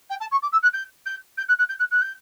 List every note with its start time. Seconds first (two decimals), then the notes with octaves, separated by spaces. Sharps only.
0.10 G5
0.20 A5
0.31 C#6
0.42 D6
0.52 E6
0.62 F#6
0.73 G6
1.05 G6
1.37 G6
1.48 F#6
1.58 F#6
1.69 G6
1.79 F#6
1.91 F#6
2.01 G6